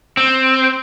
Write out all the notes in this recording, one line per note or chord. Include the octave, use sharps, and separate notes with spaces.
C4